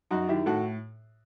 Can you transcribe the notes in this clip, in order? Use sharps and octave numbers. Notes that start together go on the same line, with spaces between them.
F#2 D#4 F#4
D#3 E4 G4
A2 F#4 A4